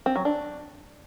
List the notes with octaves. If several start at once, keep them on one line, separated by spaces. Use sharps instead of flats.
C4
F#3
D4